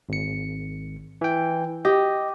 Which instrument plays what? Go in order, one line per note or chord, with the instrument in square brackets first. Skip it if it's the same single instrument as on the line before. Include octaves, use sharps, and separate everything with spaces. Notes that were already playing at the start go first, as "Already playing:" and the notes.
[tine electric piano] G#1 C#7
E3 G5
[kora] G4 [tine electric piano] D#5